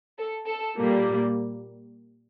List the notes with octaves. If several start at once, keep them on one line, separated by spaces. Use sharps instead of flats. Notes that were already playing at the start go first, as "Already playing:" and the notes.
A4
A4
A#2 G3 A#3